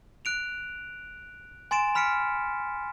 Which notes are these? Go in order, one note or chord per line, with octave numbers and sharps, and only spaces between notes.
F#6 D7 F7
G#5 C6 A6 D7 E7
B5 F6 B6 C#7 D7